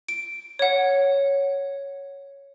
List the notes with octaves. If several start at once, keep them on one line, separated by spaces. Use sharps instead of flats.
D7
C#5 F#5